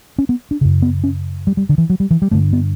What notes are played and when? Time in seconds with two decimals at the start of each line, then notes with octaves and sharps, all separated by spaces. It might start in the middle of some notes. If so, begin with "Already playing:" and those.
0.18 C#4
0.29 B3
0.51 D4
0.61 F#2 C#3
0.82 B3
1.04 C#4
1.47 G3
1.57 G3
1.69 D3
1.78 E3
1.90 F#3
2.00 G3
2.11 E3
2.22 G3
2.31 G2 D3 A3
2.53 B3